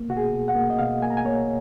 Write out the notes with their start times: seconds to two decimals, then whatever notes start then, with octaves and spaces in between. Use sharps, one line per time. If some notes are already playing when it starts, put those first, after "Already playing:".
Already playing: A#3
0.09 B2 F#4
0.17 G#4
0.32 B2
0.48 F#5
0.55 A#3
0.70 D#5
0.79 B2 F5
1.02 A#3 G#5
1.10 A#5
1.17 G#5
1.25 A#3 C#5